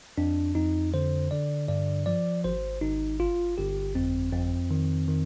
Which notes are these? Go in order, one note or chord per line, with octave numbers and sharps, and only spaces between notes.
F2 D4
F2 D#4
D3 C5
D3 D5
G2 D5
F3 D5
G#1 C5
G#1 D#4
G1 F4
G1 G4
F2 C4
F2 C4
D#3
D#3